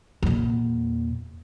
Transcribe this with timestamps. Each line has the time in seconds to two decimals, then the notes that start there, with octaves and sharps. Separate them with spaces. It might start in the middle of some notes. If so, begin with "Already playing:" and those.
0.23 E2 A#2